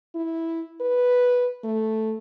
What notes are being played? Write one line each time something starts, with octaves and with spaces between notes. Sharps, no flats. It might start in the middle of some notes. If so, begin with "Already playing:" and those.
E4
B4
A3